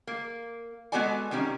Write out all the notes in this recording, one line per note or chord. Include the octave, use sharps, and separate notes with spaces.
A#3
G#3 B3 F#4 A4 D5 G#5
C3 D#3 G3 C#4